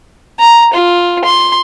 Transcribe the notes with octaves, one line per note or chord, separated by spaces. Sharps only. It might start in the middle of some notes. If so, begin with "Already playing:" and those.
A#5
F4
C6